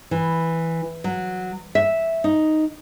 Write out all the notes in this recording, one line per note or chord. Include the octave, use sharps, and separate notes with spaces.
E3
F#3
E5
D#4